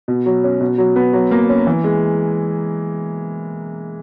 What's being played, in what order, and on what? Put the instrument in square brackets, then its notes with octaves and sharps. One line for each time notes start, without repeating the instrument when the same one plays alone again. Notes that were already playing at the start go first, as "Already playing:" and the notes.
[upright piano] B2
F#3
C#4
B2
F#3
B3
F#3
A#3
C#4
E3
G#3